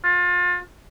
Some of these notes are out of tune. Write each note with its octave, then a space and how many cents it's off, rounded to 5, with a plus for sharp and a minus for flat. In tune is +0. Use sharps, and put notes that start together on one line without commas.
F4 +30